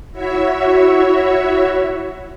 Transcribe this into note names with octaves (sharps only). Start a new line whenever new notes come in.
E4 F#4 C#5 E5